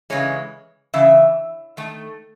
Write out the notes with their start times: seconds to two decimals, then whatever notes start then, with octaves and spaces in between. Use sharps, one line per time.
0.10 C#3 E3 G#3 C#5
0.94 C#3 E3 E5
1.77 D#3 A3